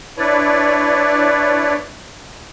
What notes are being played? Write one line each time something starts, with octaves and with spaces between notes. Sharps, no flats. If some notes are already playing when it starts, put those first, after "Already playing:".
D4 E4 B4 C#5 D5